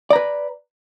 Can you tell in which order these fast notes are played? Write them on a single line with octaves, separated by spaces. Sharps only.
D5 A#5 B4